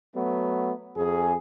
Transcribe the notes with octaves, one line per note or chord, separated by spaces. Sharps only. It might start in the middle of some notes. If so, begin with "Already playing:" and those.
F#3 A3 B3
F2 G#4